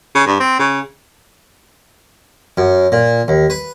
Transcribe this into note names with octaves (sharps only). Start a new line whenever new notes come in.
C#3
G2
C4
C#3
F#2
A#2
D#2
B4